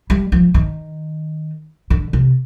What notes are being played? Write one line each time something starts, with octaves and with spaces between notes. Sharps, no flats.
G3
F3
D#3
D3
C3